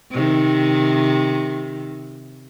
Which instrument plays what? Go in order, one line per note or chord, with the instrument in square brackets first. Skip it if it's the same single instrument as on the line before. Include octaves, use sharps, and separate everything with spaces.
[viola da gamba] C3 D#3